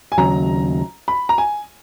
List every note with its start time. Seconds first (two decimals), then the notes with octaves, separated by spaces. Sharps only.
0.12 G#5
0.18 D#2 C#3 F#3 A#5
1.08 B5
1.29 A#5
1.38 G#5